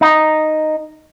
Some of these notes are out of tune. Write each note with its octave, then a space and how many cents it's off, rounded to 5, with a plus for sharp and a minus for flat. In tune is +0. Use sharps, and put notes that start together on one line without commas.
D#4 -5